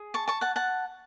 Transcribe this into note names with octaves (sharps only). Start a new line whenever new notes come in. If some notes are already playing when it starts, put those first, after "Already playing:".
Already playing: G#4
A5 C#6
A5 C#6
F#5 A5
F#5 A5